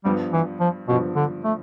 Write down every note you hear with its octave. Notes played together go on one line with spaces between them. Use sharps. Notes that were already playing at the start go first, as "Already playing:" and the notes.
G2 F3 G3 B3
E3
F3
G2 B2 F3 B3
D3
A3